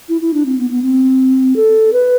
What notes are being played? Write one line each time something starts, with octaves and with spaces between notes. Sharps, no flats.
E4
E4
D4
C4
B3
B3
C4
A4
B4